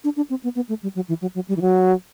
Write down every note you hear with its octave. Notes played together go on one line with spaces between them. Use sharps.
D4
D4
C4
B3
B3
A3
G3
F#3
E3
F#3
F#3
G3
E3
F#3